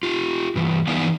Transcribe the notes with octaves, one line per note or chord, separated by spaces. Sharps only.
F4 G4
G2 E3
E3 B3 D#4 D5 F5 G#5